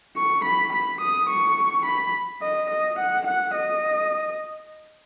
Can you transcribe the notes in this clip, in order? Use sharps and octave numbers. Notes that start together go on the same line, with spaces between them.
C#6
B5
B5
D#6
C#6
B5
D#5
D#5
F#5
F#5
D#5